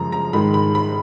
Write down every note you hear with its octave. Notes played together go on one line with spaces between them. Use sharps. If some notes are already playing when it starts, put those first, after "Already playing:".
Already playing: F#2 C#3 F3 G#3 A#5
A#5
G#2 D#3 G#3 B5
B5
B5